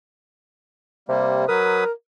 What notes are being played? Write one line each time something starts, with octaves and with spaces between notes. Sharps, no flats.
C3 G3 A#3
F#3 A#4 B4 D#6